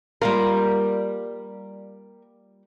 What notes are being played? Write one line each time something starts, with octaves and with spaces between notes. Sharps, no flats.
G3 A#3 F4 A#4